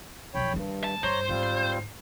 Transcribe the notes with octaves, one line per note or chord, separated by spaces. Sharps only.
B1 F2 C#5 G5 B5
G2 D#3 G3
A5
G2 C5 C#5 A#5
G#2 D3 G3 C4 F4